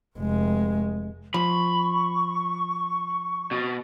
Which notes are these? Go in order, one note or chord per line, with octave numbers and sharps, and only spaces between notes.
F1 G#3
F3 B5 C#6
B2